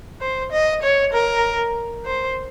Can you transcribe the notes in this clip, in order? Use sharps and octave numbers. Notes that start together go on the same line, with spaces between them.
C5
D#5
C#5
A#4
C5